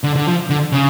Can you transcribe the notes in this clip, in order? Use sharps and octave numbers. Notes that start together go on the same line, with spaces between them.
D3
D3
F3
D3
C#3